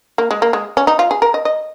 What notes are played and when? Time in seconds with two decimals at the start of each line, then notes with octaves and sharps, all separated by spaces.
0.18 A#3
0.31 G#3
0.42 A#3
0.53 G#3
0.77 C#4
0.87 D#4
0.99 F4
1.11 G#4
1.22 A#4
1.34 D#5
1.45 D#5